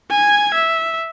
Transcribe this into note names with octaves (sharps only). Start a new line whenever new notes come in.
G#5 G#6
E5